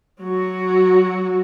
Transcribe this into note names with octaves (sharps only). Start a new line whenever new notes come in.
F#3 F#4